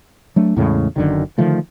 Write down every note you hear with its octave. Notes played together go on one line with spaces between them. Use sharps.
F#3 A3 D4
E2 A2 C#3 G#3
F#1 F#2 D3 D#3
D3 D#3 F3 A3